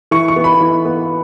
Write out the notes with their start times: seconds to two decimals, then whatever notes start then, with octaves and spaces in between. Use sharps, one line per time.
0.11 E3 C#6
0.28 C#6
0.36 B3
0.44 B5
0.60 E3
0.85 B3